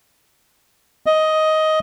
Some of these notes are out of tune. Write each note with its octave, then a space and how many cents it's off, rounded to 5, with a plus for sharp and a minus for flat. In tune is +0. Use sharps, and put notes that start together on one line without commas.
D#5 +10